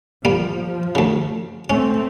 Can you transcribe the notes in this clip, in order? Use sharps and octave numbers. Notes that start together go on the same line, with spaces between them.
F3 G3 A#3
D2 C#3
A3 C4 C#4